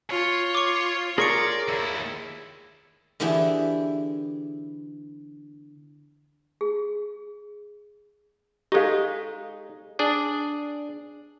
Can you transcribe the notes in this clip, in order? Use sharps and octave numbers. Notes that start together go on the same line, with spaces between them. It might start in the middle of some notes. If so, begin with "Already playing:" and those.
F4 C#5
C#6 D6
G#4 A#4 C#5 D5 C6 C#6 C#7
D#2 E4
D3 E3 B3 E4 G4 G#4
G#4
G#3 D#4 G4 A4 F5
D4 G#4 D5